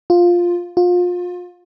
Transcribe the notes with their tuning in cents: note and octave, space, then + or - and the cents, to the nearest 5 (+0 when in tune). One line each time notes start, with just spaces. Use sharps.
F4 +5
F4 +30